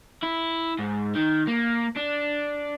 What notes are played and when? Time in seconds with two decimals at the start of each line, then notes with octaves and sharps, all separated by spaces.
0.23 E4
0.79 G#2
1.15 D#3
1.47 A#3
1.96 D4